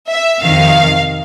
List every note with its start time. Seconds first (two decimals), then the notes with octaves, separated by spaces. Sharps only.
0.12 E5
0.43 F2 C3 D#3 F5